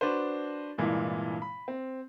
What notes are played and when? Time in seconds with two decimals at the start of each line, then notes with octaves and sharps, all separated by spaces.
0.01 D4 F#4 B4 C5
0.78 C2 G2 A#2 E3 G#3
1.42 B5
1.68 C4